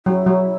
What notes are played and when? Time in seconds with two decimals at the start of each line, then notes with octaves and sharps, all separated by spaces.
0.06 F#3 E4
0.26 F#3